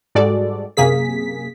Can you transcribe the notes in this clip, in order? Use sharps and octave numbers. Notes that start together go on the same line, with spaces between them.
G#2 G3 G#3 F#4 A4 D5
F#2 C3 A#3 G#4 B6